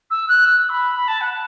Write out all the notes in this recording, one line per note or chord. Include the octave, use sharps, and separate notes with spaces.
E6
F#6
E6
B5
B5
A5
F#5